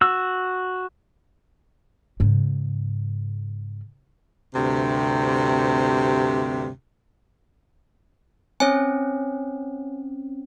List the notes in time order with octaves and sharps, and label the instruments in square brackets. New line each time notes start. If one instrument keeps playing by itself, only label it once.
[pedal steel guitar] F#4 E6
[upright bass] G#2 C#3
[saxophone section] D2 G2 C3
[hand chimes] C4 C#4 [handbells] C#5 G#5